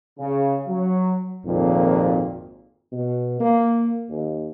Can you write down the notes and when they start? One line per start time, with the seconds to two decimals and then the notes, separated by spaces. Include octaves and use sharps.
0.19 C#3
0.68 F#3
1.45 G#1 F2 A#2
2.92 B2
3.40 A#3
4.10 D#2